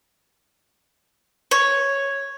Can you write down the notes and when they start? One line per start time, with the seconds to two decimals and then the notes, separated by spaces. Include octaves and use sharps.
1.51 C#5